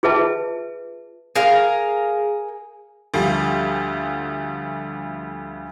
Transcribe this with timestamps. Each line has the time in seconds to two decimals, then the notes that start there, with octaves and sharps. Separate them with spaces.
0.03 F4 G#4 B4 E5 A5
1.35 G#4 A#4 F5
3.14 D2 F3 G3